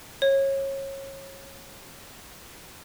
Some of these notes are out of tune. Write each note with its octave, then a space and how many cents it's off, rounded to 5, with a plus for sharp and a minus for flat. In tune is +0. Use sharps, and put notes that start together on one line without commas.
C#5 -25